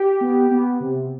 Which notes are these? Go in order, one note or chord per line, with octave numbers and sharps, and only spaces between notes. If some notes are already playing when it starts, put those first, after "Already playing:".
Already playing: G4
B3
B3
C3